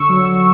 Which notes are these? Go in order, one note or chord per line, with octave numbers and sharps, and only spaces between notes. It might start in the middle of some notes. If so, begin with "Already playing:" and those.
Already playing: D3 C#6 E6
F#3